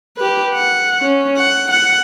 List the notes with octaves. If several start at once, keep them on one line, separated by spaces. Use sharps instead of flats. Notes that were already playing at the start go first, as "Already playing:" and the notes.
G4 B4
F#5
C#4
F#5
F#5